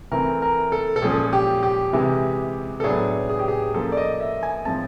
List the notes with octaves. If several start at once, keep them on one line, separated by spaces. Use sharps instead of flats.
E3 A3 C4 A#4
A#4
A4
A4
A#2 F3 G#3 C#4 G#4
G4
G4
C3 E3 G#3
A4
A2 F#3 B3 D4 G#4
G#4
G4
G#4
F3 A#3 C#4 A4
D5
D#5
E5
G#5
A2 F3 G#3 C4 A5